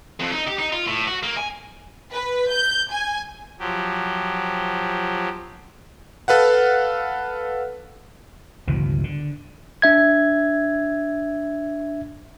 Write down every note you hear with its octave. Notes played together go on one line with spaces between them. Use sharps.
F2
D#4
G4
D#4
F4
A2
F#4
A#3
G#5
B4
G6
G#5
F3 F#3 G4
A4 B4 F5 F#5
G1 C#2 B2 E3
D3
D4 E5 G#6